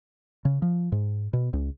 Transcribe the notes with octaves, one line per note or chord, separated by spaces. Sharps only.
C#3
F3
G#2
B2
C#2